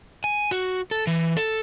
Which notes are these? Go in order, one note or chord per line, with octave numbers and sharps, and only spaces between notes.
G#5
F#4
A4
E3
A4